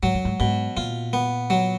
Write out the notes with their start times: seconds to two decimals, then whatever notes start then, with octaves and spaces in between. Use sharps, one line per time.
0.03 G#2 F#3
0.14 F#2
0.25 G#2
0.40 G#2 B2
0.77 A#2 F4
1.13 B3
1.50 F#3